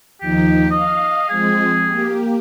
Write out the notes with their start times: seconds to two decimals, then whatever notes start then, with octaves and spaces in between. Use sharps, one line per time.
0.21 D#2 F3 D#4 G4
0.70 D#5 F5
1.29 F3 G#3 C4 G#4
1.85 A#3 G4